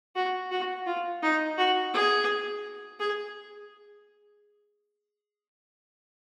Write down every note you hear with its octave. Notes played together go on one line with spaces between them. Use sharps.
F#4
F#4
F4
D#4
F#4
G#4
G#4